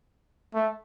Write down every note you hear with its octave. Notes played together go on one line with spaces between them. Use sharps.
A3